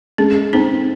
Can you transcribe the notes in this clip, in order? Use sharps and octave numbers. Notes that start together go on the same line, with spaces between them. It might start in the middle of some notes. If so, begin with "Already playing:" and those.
G#3 C#4
C4 C#4 D#4